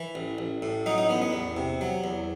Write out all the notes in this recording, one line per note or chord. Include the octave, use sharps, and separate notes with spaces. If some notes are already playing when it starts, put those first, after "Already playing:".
Already playing: E3
A1
A1
A2
F#3 D#4
D#4
A1 B3
B3
E2
C3
F#3
E2